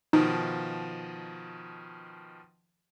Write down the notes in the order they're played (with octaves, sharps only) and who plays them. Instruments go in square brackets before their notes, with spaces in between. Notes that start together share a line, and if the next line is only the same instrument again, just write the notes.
[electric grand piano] B2 D#3 F3 [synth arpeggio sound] D#4